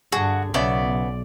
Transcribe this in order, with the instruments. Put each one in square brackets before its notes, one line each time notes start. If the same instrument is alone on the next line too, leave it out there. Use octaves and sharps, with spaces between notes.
[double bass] G2 [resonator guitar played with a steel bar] D3 G#4 [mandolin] F#4
[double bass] B1 [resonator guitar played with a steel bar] C#3 B3 E5 [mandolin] D5